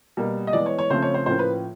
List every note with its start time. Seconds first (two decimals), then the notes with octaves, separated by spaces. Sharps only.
0.17 B2 G3 A#3
0.47 D#5
0.53 E3 G#3 B3 D5
0.66 C#5
0.79 C#5
0.90 C#3 F3 A3 C4 C5
1.02 C#5
1.14 C5
1.26 A2 F3 A#3 C#4 C5
1.39 B4